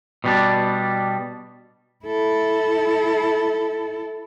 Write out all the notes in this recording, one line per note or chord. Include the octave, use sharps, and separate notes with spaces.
B2 G3 D4
E4 A4